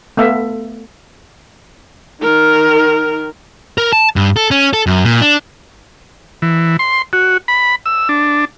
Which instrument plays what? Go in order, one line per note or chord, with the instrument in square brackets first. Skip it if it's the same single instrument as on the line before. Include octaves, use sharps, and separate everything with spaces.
[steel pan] A3 B3 E5 F5
[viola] D#3 A#4
[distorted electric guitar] A#4
A5
G2
A4
C#4
A4
F#2
A#2
D4
[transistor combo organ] E3
C6
F#4
B5
E6
D4